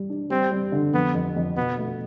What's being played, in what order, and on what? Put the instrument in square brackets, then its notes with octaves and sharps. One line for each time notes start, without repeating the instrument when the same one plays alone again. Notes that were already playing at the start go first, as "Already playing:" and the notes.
Already playing: [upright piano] G3
D4
[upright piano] G3 [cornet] C4
[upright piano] G3
D3
[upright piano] F2 [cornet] B3
[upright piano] F2
F2
[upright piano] B2 [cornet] B3
[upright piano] A3